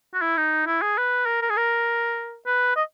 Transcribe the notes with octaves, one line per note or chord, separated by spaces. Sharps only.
F#4
E4
D#4
E4
G#4
B4
A#4
A#4
G#4
A#4
B4
D#5